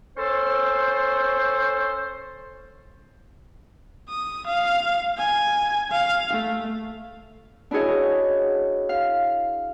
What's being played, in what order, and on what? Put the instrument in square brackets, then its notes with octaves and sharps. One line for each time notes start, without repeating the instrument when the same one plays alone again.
[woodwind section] C#4 A4 C5
[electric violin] D#6
F5
G#5
F5
A3
[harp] D4 E4 F#4 G#4 C#5 D#5
F5